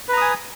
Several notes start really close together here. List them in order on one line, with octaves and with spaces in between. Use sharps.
B4 A#5 D#6 G#5